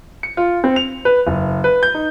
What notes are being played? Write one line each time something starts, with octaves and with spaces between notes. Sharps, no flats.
C#7
F4
C4
F7
B4
F#1
B4
G6
D#4